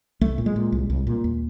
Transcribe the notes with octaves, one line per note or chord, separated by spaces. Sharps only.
C2 A3
A#2
G#3
A#2
C2
C2
A#2
D#2